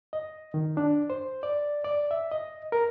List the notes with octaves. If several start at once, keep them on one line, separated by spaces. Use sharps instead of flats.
D#5
D#3
D4
C5
D5
D5
E5
D#5
A#4